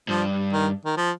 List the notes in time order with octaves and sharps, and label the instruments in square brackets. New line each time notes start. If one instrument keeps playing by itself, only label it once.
[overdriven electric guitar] G2 [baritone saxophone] F3
[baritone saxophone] D#3
D#3
F3